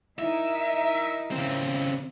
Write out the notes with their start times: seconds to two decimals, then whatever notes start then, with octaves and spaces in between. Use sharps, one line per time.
0.19 D#4 E4 A#4 E5
1.31 C#3 C4